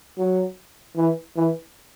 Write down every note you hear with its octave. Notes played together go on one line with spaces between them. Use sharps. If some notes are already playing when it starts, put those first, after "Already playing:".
F#3
E3
E3